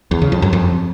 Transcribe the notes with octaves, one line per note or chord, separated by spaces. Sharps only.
E2
C#3
F2
F#2
F2